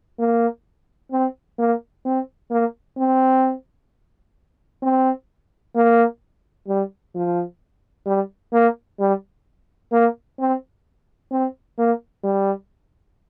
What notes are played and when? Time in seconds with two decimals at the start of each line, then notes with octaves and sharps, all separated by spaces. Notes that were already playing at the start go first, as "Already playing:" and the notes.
0.19 A#3
1.12 C4
1.59 A#3
2.05 C4
2.51 A#3
2.98 C4
4.82 C4
5.75 A#3
6.68 G3
7.15 F3
8.06 G3
8.53 A#3
8.99 G3
9.92 A#3
10.39 C4
11.31 C4
11.78 A#3
12.24 G3